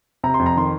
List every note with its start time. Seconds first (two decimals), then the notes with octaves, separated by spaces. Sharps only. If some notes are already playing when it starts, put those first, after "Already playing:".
0.24 C3 A#5
0.34 C6
0.39 F2
0.46 A#5
0.56 D#3 C6